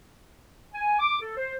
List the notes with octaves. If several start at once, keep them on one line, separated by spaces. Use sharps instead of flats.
G#5
D6
A4
C5